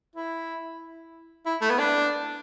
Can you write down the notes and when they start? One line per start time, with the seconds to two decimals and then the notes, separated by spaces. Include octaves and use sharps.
0.15 E4
1.46 E4
1.61 A3
1.70 B3
1.79 D4